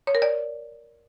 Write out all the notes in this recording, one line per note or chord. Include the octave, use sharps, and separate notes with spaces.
C#5
A#4
D5